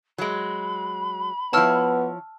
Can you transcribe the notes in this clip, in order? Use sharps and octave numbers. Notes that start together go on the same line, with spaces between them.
F#3 G#3 B5
F3 B3 E4 C#5 A5 E6 F6